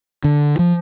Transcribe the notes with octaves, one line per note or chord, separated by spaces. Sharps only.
D3
F3